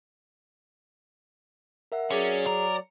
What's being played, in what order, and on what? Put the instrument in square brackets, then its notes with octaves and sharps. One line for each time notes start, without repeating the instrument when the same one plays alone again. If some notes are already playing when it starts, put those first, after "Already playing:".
[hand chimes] A#4 E5 F#5
[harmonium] F#3 D5 [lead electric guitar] C#4 [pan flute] G#4 [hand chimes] C#7
[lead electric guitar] A#4